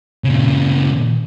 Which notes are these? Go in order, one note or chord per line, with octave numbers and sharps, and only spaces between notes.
A#2 C#3